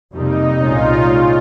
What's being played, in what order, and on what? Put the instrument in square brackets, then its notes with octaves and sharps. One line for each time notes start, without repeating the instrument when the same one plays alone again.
[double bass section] F2 C3 G3 A#3 [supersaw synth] D#4
[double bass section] C2 A#2 G#3 C#4 [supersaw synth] F4
[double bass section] A#2 G#3 C#4 [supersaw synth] F4